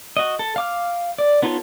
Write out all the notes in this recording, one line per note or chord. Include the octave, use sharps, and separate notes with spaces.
F#4 D#5
A4
F5 D6 F6
D5
B3 D#4 F4 A4 C#5